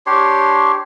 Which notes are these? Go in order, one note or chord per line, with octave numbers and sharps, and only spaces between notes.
D4 G4 C#5 C6